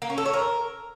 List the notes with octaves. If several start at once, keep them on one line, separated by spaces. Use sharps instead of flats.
A#3
C#4
A4
C#5
A#4